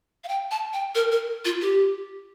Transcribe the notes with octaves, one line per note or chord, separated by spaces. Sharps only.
F5
G5
A5
G5
A#4
A#4
F4
G4